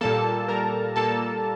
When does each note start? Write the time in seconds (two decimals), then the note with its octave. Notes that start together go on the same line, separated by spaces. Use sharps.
0.01 A#2 G3 A#3 A4 A5
0.48 A#2 G3 A#3 A#4 A#5
0.96 A#2 G3 A#3 A4 A5